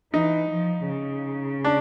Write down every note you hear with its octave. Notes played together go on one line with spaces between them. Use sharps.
E3 D#4
F3
C#3
D4